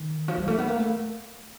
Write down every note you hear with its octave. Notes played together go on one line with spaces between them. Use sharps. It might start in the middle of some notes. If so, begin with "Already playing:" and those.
Already playing: D#3
F3
G3
A3
B3
A#3
A3